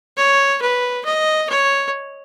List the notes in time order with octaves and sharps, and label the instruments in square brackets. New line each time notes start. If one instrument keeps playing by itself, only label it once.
[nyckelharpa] C#5
B4
D#5
C#5